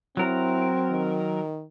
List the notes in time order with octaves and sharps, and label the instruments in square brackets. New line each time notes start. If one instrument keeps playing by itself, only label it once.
[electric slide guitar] F#3 A#4 [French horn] C4 [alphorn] E4
[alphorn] D#3